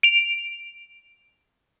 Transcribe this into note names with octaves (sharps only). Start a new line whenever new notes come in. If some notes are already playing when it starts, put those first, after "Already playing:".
D7 F7